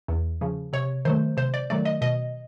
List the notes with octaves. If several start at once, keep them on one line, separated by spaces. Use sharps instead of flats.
E2
C#3 F3
C3 C#5
D#3 F#3 A3 C5
C3 C5
D5
D#3 F#3 A3 D5
D#5
B2 D#5